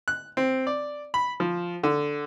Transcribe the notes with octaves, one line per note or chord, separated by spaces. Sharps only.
F#6
C4
D5
B5
F3
D3